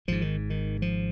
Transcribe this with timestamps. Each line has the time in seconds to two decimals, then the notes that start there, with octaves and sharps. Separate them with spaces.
0.08 G#1 G#2 F3
0.22 D#3
0.50 D#3
0.82 F3